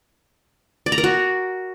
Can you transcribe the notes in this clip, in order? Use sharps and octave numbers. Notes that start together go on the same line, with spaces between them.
D5
A#5
A#4
F#4